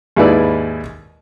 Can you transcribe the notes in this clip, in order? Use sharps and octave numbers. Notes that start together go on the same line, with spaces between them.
D#2 G#2 E4 B4 D5